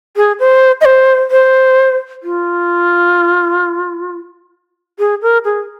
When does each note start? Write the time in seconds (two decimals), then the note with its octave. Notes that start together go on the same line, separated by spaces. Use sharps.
0.16 G#4
0.40 C5
0.81 D#5
0.85 C5
1.31 C5
2.23 F4
4.99 G#4
5.22 A#4
5.45 G#4